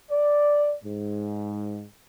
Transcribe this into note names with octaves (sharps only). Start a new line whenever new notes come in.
D5
G#2